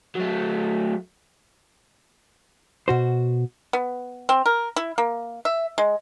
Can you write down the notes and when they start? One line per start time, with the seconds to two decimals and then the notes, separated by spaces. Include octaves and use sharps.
0.15 F#3 A3
2.88 B2 F#4 C5
3.73 B3
4.29 C4
4.46 A#4
4.76 E4
4.98 A#3
5.45 E5
5.78 G#3